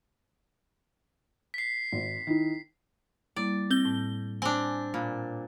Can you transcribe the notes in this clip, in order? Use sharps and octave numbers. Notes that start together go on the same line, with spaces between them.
B6 C7
G#1
D#3 E4
G3 A#3 E4 D5
C4 G6 G7
A2 A5
C4 D4 G#5
A#2 B5 F#6